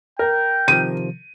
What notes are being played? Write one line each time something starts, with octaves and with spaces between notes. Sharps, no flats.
A#4 G5
C3 D#3 F3 D#7